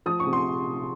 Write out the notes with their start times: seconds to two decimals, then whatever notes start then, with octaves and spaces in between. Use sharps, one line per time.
0.06 F3 D#6
0.20 C#6
0.27 C3
0.33 C6